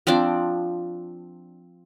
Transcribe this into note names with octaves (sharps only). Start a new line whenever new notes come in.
F3 C4 D4 D5